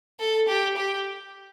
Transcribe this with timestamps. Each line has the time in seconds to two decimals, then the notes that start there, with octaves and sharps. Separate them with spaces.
0.20 A4
0.48 G4
0.77 G4